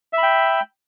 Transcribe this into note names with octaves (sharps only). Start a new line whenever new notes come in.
E5 G5 B5